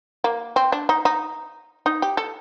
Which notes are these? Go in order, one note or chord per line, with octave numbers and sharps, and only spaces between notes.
A#3
C4
D4
D#4
D#4
D#4
G4
A4